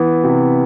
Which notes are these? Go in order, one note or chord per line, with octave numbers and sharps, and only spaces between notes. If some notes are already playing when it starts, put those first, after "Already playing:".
Already playing: E3 B3
C3